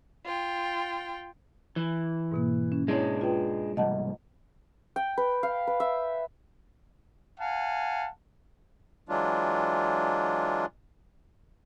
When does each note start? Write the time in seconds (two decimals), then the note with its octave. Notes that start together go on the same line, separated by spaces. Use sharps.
0.25 F4 G5
1.76 E3
2.32 G#2 B2 A#3
2.72 C#4
2.88 G#3 D4 E4 C#5
3.21 F4 B4 G5
3.77 C2 G#2 D#5 F#5 A5
4.96 G5
5.18 B4
5.43 F5
5.67 B4
5.80 E5
7.39 F5 F#5 G#5 A5
9.09 E3 F#3 G#3 D4 F4